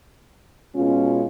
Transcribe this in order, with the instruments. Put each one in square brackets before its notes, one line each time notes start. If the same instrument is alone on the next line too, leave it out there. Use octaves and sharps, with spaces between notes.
[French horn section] B2 G#3 C#4 F4